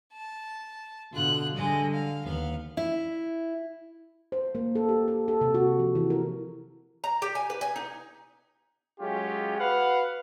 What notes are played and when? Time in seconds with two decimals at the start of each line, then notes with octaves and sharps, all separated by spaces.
0.13 A5
1.14 B2 D3 F4 F#6
1.56 D3 G3 G#3 D#5
1.93 F5
2.24 D#2 B3 F5
2.77 E4
4.32 C5
4.55 A#3
4.75 A4
4.89 G4
5.08 A4
5.28 A4
5.41 C3
5.54 F#4
5.80 F3
5.95 E3
6.10 A#4
7.04 A#5
7.22 G4
7.35 G#5
7.50 B4
7.61 G#5
7.76 D#4
9.00 F#3 G#3 C#4 F4 G4
9.58 F#4 B4 F5 F#5